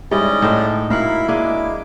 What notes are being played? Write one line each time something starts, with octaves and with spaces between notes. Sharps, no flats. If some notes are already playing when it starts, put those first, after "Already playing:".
G#2 G3 C#4 E4 D5 D#5
A2 D#4 C5
A#2 E4 F#4 A#4 F5 F#5 B5
G#3 A#3 D4 G#4 D6